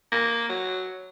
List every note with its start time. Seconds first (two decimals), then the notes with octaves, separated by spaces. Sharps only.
0.12 A#3
0.49 F#3